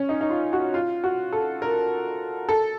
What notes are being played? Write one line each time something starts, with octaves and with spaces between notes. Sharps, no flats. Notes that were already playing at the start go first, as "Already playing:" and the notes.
Already playing: C#4
D#4
D#4
F4
F#4
F4
F#4
A4
A#4
A4